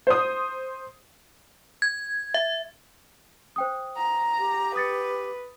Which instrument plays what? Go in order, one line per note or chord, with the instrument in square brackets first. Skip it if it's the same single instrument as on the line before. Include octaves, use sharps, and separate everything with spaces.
[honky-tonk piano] C5 D#6
[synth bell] G#6
E5
[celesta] C5 G5 D#6
[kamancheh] A#5
[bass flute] G4
[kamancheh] B4 [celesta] D#6 A6 C#7